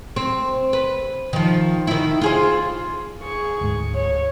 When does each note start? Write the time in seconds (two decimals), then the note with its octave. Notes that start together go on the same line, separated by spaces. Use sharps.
0.16 C4
0.73 B4
1.33 D#3 F3
1.87 D#3 E4
2.21 F4 G#4 C5
3.21 G#4 C#6
3.61 D2 G#2
3.95 C#5